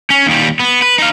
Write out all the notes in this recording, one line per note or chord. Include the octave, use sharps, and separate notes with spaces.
C#4
D#2 G3
B3
B4
D#4 F5